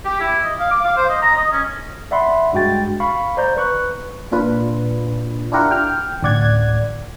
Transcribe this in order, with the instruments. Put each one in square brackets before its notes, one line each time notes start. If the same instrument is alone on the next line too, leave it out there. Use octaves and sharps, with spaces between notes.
[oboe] G4
E4
D#5
F5
D6
F5
C5
D#5
A#5
D#5
C#4
[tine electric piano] D5 E5 F#5 B5 C6
G2 G#3 F#4 G5 A6
F5 B5 C#6
C5 D5 A#5 G6
B4 C#6 F#6
[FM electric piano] A#2 D4 F4 B4
D4 E4 F4 G4 A#4 F#5
G5 F6
A1 D2 D5 F#5 G#6